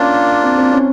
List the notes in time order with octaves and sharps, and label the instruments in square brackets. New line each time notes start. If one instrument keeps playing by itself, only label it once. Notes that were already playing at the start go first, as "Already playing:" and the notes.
Already playing: [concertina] A#3 D4 F4 [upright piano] C#4
[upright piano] C4
C4
C#4